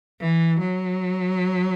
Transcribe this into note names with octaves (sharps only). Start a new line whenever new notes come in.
E3
F#3